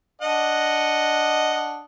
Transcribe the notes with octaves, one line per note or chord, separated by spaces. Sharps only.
D4 D#5 F#5